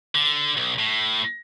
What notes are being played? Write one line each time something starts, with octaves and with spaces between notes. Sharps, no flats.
D3
B1
A2